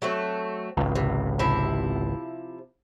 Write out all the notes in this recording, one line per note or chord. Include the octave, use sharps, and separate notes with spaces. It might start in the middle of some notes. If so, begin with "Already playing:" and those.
F#3 A3 C4
G#1 C#2
C3
C3 F3 E4